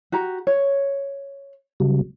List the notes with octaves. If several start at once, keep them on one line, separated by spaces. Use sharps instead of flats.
F#4 G4 A#5
C#5
C#3 F#3 G3